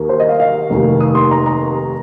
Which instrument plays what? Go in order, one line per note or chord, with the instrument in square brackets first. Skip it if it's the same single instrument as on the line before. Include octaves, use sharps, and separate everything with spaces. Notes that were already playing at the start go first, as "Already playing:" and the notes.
Already playing: [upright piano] D#2 D#3 A#3
C5
D#5
F5
F5
F1 D#2 D#3
D#6
C6
A#5
A#5